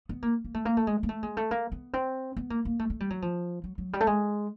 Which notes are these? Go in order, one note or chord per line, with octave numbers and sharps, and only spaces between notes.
B3
A#3
A#3
A3
A#3
A3
G#3
A#3
A3
G#3
A3
A#3
B3
C4
B3
A#3
A#3
A3
A3
G3
F#3
F3
F#3
F#3
G3
A3
G#3